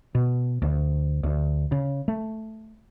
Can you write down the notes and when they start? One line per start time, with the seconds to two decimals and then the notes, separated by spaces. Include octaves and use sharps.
0.15 B2
0.62 D2
1.23 D2
1.72 C#3
2.08 A3